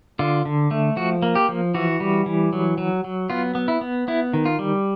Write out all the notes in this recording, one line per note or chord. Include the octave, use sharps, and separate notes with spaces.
D3 F4
D3
A3
F3 F#4
A#3
G4
F3
E3 F#4
G3
E3
F#3
F#3
F#3
B3 F4
B3
E4
B3
B3 E4
D#3
F4
G3